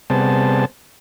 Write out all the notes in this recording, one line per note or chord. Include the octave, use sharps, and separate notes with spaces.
C3 G3 B3 G#4 C5 A5